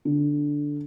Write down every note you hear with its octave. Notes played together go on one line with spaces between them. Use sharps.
D3